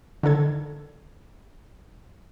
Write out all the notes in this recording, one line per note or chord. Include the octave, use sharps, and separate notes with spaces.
D3 D#3 A4 G#6